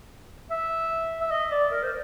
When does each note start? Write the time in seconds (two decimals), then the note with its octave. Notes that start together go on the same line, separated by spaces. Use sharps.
0.50 E5
1.21 E5
1.31 D#5
1.51 D5
1.72 A#4
1.83 C5